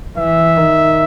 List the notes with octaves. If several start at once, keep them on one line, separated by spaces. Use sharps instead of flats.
E3 E5
D#3